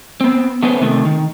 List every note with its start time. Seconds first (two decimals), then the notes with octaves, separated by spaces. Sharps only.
0.21 B3 C4
0.63 A3 B3 C#4 B4 C5
0.81 C3 D#3 A3
1.05 D#3